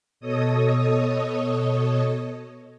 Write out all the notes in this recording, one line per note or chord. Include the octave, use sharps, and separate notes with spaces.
B2 A4 C#5 D#5 D#6